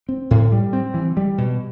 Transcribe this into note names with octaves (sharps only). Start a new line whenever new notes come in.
C4
A2
G3
C4
E3
G3
B2